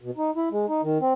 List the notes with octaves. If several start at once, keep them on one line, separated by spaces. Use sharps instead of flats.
B2
D#4
E4
G#3
D#4
D#3
C4